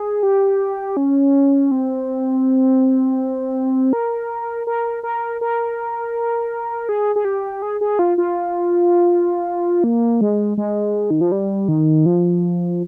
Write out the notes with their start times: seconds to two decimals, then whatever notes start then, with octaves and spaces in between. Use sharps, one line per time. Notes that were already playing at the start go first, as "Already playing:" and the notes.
Already playing: G#4
0.23 G4
0.97 C#4
1.71 C4
3.93 A#4
4.67 A#4
5.03 A#4
5.41 A#4
6.89 G#4
7.16 G#4
7.25 G4
7.62 G#4
7.81 G#4
7.99 F4
8.18 F4
9.84 A#3
10.21 G#3
10.58 G#3
11.10 D#3
11.21 F3
11.32 G3
11.68 D#3
12.06 F3